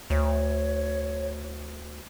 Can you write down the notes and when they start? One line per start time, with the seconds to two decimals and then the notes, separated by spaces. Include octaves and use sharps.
0.10 D2 C#5